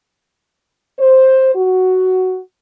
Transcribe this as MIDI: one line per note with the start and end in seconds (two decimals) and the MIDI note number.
1.00 1.53 72
1.55 2.38 66